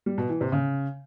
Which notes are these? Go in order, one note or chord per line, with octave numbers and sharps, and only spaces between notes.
G3
B2
E3
C3
C#3